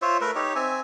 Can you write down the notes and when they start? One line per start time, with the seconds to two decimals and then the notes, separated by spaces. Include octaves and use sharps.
0.02 F4 C5 C#5 E5
0.21 A3 A#4 B4 E5
0.35 D#4 G4 C#5
0.56 C4 E5 G#5